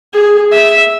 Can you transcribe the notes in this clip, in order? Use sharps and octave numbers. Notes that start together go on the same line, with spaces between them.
G#4
E5